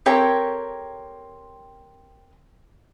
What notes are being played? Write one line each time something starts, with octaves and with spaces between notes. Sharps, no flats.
C4 G4 A4 A#4 C#5 G5